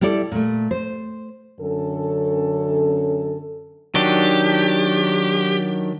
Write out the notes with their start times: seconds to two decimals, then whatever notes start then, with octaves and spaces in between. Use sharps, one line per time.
0.01 G3 E4 A4 D5
0.32 A#2 A3
0.71 C5
1.60 F#2 D3 C#4 A4
3.95 D#3 F#3 D4 G4